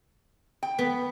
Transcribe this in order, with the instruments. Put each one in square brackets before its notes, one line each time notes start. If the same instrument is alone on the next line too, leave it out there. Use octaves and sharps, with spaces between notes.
[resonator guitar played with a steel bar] G5
[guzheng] B3